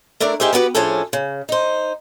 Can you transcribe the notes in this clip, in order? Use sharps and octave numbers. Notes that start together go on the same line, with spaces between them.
A3 D4 E4 A#4 D5
A#3 D#4 G4 G#4 C5 E5
B3 F#4 G4 B4
A2 F3 C#4 D4 G#4 A4
C#3
D#4 C5